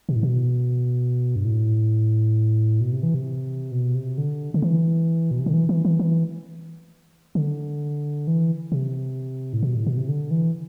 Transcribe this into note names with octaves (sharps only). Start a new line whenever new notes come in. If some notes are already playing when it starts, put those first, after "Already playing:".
B2
A2
B2
G2
A2
B2
C3
E3
C3
B2
C3
D3
D3
E3
B2
C3
D3
E3
E3
E3
E3
D3
E3
C3
A2
B2
A2
B2
C3
D3
E3